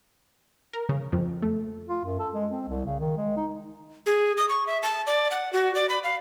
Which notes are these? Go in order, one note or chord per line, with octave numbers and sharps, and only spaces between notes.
A#4
C#3
F2
A3
F4
F#2
A4
G#3
C4
C2
C#3
D#3
G#3
D#4
G#4
D#6
C#6
E5
A5
D5
F#5
F#4
D5
B5
F5